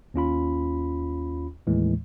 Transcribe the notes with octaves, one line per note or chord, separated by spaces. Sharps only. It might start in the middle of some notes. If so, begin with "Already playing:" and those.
D#2 C#4 F4 B5
D#2 A2 E3 G#3